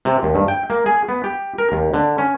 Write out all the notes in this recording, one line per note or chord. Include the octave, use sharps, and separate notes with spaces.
C3
D#2
G2
G5
A#3
G#4
B3
G4
A#4
D#2
D3
C#4